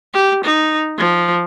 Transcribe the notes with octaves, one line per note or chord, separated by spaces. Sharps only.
G4
D#4
F3